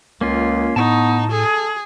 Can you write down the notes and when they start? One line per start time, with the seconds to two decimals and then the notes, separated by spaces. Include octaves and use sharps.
0.21 C#2 A#3 C#4 F4
0.76 A2 B3 D#4 A5 C#6
1.32 G#4 A4